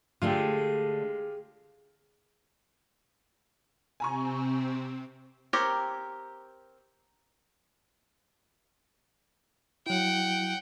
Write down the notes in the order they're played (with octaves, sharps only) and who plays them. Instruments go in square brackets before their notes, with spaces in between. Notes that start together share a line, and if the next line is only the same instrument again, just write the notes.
[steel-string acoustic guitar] D3 A3 D4 [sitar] G#3 [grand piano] F4 G4
[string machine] C3 C4 [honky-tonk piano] G#5 A#5 C#6
[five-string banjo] C4 G4 A#4 C#5
[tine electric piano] F#3 E4 [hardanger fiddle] F#5 G5